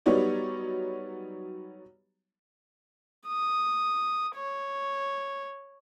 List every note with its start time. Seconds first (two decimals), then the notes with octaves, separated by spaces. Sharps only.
0.06 F#3 G3 B3 D#4 C#5 D5
3.27 D#6
4.36 C#5